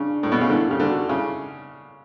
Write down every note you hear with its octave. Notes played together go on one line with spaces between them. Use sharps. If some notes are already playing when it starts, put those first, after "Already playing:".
Already playing: C#3 D4
A2
B2
C#3
D3 E4
C#3 G4
D3
F#4
C#3 E4